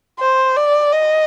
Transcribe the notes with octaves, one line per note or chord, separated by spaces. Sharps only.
C5
D5
D#5